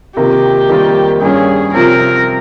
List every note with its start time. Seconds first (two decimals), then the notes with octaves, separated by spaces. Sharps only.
0.17 C3 D#3 A#3 F4 G4
0.69 F2 D#3 G3 A#3 F4
1.21 G2 G3 C#4 G#4
1.74 C3 F3 C4 F4 A#4